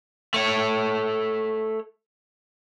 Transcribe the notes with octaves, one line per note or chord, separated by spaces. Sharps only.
A3 C#5